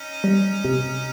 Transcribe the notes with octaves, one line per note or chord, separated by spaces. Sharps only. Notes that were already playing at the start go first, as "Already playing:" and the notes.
Already playing: C#4 D#4
G3
C3